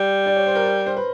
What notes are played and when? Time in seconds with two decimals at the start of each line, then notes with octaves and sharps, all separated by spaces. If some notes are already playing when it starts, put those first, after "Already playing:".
Already playing: G3
0.26 D5
0.36 C#5
0.46 C5
0.55 A#4
0.86 C5
0.97 B4